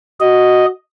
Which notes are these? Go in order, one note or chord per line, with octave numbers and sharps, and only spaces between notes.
F#4 D#5